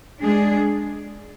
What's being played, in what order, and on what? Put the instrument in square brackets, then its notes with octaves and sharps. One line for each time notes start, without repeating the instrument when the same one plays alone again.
[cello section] G#3 D4 G#4